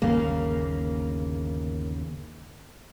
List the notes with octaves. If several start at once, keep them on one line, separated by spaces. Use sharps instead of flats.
G1 D#2 C#3 A#3